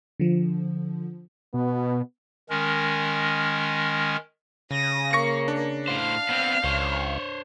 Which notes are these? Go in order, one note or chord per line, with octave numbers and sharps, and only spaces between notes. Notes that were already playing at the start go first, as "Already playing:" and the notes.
D3 F3
B2 B3
D#3 G#3 C#4 A#4
C#3 D#6 A#6
A#3 C#6 A#6 C#7
D4
A2 C5 F5 F6
B3 C4
C#2 C5 C#5